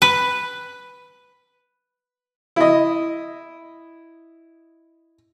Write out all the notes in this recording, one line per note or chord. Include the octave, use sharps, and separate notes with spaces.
B4
E4 D#5